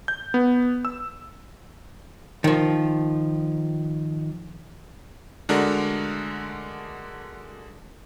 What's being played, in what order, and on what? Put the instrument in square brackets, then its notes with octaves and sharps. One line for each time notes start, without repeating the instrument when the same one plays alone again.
[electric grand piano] G6
B3
E6
[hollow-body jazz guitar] D#3 F3
[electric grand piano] D3 G#3 A3 D4 F#4 A#4